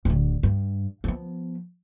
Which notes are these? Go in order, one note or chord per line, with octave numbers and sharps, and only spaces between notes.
D1 D3
G2
F3 B3